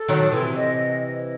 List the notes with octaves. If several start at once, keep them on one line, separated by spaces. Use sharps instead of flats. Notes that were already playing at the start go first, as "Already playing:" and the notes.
Already playing: A4
D#3 F#3
C3 E3
D#5